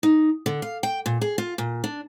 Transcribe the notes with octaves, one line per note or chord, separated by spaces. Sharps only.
D#4
D3
F5
G5
A#2
G#4
F4
A#2
D4